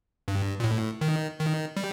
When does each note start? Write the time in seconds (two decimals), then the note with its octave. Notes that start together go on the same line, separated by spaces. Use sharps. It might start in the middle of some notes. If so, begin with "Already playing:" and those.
0.28 G2
0.60 A#2
0.64 A2
1.01 D#3
1.39 D#3
1.77 G3